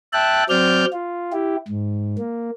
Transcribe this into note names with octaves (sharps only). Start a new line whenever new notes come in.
E5 G5 A5 F#6
F#3 C4 D5 F6 G6
F4
E4 G4
G#2
A#3